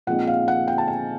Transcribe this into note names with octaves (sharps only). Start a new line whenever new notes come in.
A#2 F3 G#3 C4 D#4 F#5
F5
F#5
G5
A5
G#5